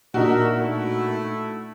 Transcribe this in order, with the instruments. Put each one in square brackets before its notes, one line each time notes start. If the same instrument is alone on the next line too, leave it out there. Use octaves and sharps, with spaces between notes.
[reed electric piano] A#2 D4 D#4 [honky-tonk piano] F#4 [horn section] A#4 E5
[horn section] A3 E4